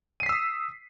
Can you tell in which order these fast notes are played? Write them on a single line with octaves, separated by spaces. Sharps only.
D#7 C7 B6 E6 D#6